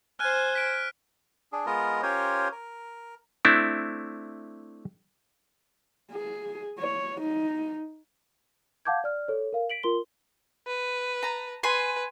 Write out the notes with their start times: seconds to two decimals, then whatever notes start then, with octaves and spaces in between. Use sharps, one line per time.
0.19 C5 G#5 F6 F#6 D#7
0.53 F#6 B6 D7
1.53 D4 G#4
1.66 G#3 B3 F4 A#4 D#5
2.02 C#4 F4 G4 A#4 C5 C#5
2.52 A#4
3.45 A3 C4 D4 E4
6.12 G#4
6.79 C#5
7.21 D#4
8.85 F5 F#5 A5 D6 G6 G#6
9.04 D5 F6
9.28 A4 C#5
9.53 A#4 F5
9.70 B6 D7 F#7
9.83 F4 A#4 C6 G7
10.67 B4
11.23 A5 A#5
11.63 B4 G#5 C6